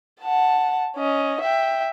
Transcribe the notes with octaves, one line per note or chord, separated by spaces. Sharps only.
F#5 A5
C#4 D#5
E5 G5